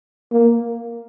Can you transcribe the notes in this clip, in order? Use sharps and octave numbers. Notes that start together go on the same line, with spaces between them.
A#3